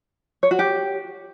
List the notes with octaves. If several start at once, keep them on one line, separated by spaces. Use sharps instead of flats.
C#5
F#4
G4